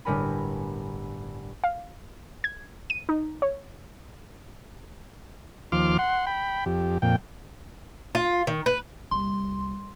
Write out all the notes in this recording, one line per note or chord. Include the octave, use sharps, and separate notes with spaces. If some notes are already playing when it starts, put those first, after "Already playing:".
G1 A2 G3 A#4 G#5 B5
F5
G#6
D#7
D#4
C#5
D#2 F3 C6 D6 F6
F#5 C6
G5 B5
F2 G4
F2 A#2 G5
F4
D#3
B4
C2 A#3 C6